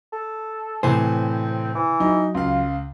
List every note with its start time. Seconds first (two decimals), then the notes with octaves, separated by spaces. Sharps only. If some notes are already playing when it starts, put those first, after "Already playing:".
0.13 A4
0.83 A2 C3 E3 C4 C5 G#5
1.75 E3
2.00 F#3 D#4
2.34 C#2 F4 F5